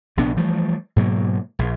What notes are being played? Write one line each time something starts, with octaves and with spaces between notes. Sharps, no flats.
A#1 C3 B3 D4
E3 F3 G3 A3
G#2 B2 F#3 A#3
A#1